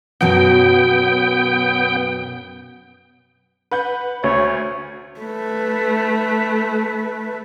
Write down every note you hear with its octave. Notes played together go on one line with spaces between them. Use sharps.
F#2 B2 F#3 B3 G5
B4 F#5 G6
D2 C#5
A3 B4